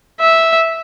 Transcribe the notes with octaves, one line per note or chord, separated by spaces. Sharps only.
E5